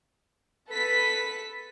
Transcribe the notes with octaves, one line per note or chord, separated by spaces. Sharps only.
A4 B4 B6